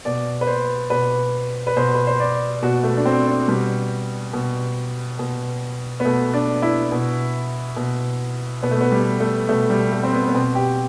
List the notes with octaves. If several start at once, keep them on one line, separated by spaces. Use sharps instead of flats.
B2 D5
B4
C5
B2 B4
B4
B2 C5
B4
C5
D5
B2 F#4
A3
D4
C4
D4
B2 G3
B2
B2
B3
B2 A3
D4
E4
B2
B2
B2 B3
A3
B3
G3
A3
B2 A3
G3
A3
C4
B3
B3
B2 C4
G4